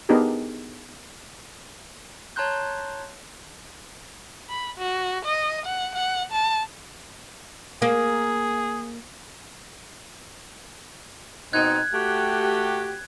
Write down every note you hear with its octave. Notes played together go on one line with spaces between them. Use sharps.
B3 D4 D#4 G4 G#4 A#4
C#5 A5 A#5 C6 F#6 G6
B5
F#4
D#5
F#5
F#5
A5
A#3 G#4
B2 C4 D#4 F#6 G#6
A3 F#4 G4